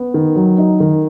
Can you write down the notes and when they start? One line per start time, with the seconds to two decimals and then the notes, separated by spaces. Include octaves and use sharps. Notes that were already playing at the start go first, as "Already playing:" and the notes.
Already playing: B3
0.14 D#3
0.36 F#3
0.58 D#4
0.80 D#3